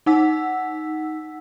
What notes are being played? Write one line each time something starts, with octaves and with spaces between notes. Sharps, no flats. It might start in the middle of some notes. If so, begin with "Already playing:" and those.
D#4 F#5 E6 B6